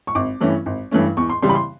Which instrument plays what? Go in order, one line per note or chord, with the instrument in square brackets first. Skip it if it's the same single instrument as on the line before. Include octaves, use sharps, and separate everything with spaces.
[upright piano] C#6
G#1 D6
G2 E3 A3 C#4
G#1
G2 E3 A3 C#4
E2 C#6
C6
C#3 E3 G3 C6
B5
C6